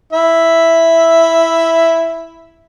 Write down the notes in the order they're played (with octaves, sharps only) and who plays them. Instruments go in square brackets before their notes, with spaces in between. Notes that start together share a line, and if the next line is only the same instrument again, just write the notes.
[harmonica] E4 E5